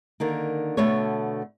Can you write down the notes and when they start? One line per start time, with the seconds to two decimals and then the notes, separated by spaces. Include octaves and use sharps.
0.20 D3 D#3 A#3
0.77 B2 D3 A3 B3 A4 C#5